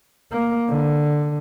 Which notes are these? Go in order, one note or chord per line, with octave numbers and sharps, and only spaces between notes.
A#3
D3